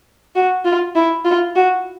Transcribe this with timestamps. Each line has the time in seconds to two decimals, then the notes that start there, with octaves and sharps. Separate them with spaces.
0.35 F#4
0.65 F4
0.95 E4
1.25 F4
1.55 F#4